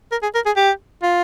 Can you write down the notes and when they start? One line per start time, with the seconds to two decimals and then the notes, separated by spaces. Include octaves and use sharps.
0.11 A#4
0.22 G#4
0.35 A#4
0.46 G#4
0.56 G4
1.03 F4